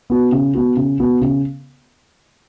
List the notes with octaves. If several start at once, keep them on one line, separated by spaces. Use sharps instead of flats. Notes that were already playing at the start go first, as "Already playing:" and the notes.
B3 F#4
C#3
B3 F#4
C#3
B3 F#4
C#3